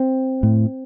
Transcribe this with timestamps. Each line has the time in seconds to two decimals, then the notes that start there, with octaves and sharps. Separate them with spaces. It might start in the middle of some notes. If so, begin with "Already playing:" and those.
Already playing: C4
0.43 A2